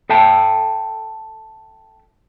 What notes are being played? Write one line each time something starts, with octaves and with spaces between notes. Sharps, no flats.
A4 E5 G5 A5